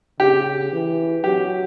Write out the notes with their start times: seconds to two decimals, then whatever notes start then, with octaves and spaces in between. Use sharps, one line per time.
0.20 C#3 G4
0.72 E3
1.24 F#3 G4